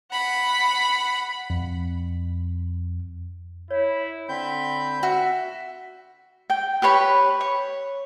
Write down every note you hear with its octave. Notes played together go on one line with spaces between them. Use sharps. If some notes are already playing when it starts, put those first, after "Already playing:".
F#5 B5
F2
E4 C#5
D3 C4 B5 G6
F#4 E5
G5
G4 B4 C#5 B5
C#5